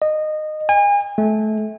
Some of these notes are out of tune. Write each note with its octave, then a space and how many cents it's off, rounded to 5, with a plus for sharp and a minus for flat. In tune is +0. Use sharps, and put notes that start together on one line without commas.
D#5 -20
G#5 -35
A3 -30